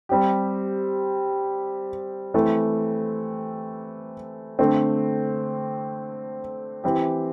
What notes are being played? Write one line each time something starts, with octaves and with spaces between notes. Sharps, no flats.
G3 C4 G4
E3 A3 C4
D3 A3 C4
E3 C4 G4